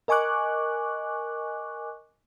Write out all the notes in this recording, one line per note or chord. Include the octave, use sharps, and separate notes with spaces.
A#4 D#5 G#5 C#6 D6 F#6